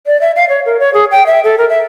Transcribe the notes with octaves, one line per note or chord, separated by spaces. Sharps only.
D5
E5
F5
C#5
A#4
C#5
G#4
G5
E5
A4
A#4
E5